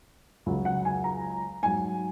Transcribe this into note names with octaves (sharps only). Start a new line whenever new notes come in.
C#2 C#3 F#3
F#5
G#5
A#5
G#2 F#3 G#5